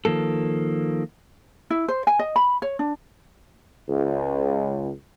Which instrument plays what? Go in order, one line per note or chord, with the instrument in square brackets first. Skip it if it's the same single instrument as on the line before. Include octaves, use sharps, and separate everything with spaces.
[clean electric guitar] D#3 F3 A#3 A4
[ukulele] E4
C5
G#5
D#5
B5
C#5
D4
[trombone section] C#2